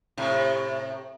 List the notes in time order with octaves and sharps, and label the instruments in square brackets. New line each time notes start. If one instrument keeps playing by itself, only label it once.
[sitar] A2 C3